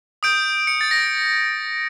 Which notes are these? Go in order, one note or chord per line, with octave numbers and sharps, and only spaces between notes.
D#6 G6 D7
C#7
A6
A#6